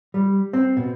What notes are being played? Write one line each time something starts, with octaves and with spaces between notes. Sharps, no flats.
G3
C4
B2